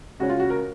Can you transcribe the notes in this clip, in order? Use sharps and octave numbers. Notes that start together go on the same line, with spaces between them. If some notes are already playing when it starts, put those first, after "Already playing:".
C#3 G#3 C#4 F#4
F4
F#4
A#4